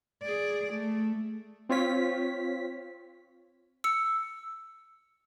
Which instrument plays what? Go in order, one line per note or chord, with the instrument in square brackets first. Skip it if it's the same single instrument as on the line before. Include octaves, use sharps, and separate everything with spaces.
[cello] G#4 D5
A3
[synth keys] C4 F4 C#5 B6
[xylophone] E6 C#7